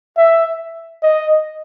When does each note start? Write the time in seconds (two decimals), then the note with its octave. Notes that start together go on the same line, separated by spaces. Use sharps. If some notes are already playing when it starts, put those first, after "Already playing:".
0.18 E5
1.03 D#5